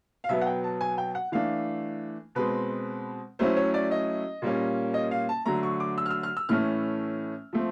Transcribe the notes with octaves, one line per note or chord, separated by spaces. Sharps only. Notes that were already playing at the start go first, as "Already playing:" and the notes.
F5
B2 F#3 B3 E5
F#5
G5
A5
G#5
G5
F#5
E3 A3 D4 F5
B2 G#3 C4 B4
F#3 A3 C#4 E4 C5
C#5
D5
D#5
A#2 G3 A#3 C#4
D#5
F5
A5
D3 F#3 A3 A#5
C#6
D6
E6
F6
E6
F6
E6
A2 E3 A3 C#4 F6
F3 A3 C4